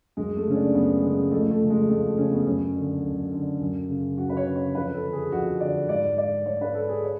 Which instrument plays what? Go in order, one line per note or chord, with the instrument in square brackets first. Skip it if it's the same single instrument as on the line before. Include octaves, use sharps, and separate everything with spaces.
[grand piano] F#2 G#3
A3
C#3 C#4
D4
F#2 B3
C#3 G#3
F2 A3
A3
C#3
G#3
F2 A3
C#3 C#4
B3
F#2 C#4
D3
F#2
D3
F#2
C#3
F#2 F#4
B4
C#5
C#3
C#5
F2 B4
A4
D3
G#4
F2 F#4
D3 D5
G#2 D5
D5
G#2 C#5
B4
A4
G#4
C#5